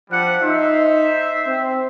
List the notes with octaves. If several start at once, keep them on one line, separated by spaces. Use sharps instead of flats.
F3 G3 D4 F#5
D#4 C5 E5
C4